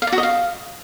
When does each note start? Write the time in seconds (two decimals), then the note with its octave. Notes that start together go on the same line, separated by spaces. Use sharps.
0.02 F5
0.07 D5
0.12 F#4
0.18 D#5
0.23 F5